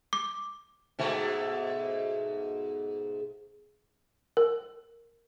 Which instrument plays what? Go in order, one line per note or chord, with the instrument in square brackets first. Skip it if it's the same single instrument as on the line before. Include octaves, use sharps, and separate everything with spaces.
[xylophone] D6
[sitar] G#2 B2 A3
[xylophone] A#4